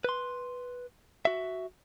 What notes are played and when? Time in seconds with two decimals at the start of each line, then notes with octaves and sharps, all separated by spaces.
0.04 B4 C6
1.25 F#4 E5